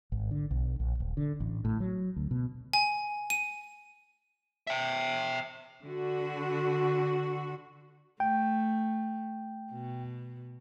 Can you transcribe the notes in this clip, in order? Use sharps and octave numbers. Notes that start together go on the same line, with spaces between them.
G#1
D3
B1
A#1
D#1
D3
A1
A2
F#3
D2
B2
G#5
D#7
E5 G5
D3 F#4
A3 G5
B2